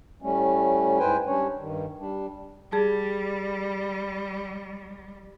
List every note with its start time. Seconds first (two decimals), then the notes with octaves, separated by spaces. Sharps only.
0.22 A2 G3 A3 C#4
0.99 G#2 E4 B4 C5 G5 G#5
1.27 G3 C#4 D4 C#5
1.59 G2 D#3
1.99 G3 D4
2.72 G3 G#4 A5